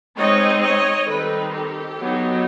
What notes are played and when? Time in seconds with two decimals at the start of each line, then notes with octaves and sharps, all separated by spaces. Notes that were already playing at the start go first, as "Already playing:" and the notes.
0.17 G#3 C4 D#4 C#5 D#5
0.62 C#5 D#5
1.07 D#3 G3 C4 D#4 A4 B4
1.52 G4 A4
1.97 F#3 B3 D#4